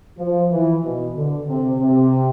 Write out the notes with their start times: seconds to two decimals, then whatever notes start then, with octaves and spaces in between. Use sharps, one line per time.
0.18 F3
0.50 E3
0.83 B2
1.15 D3
1.47 C3
1.79 C3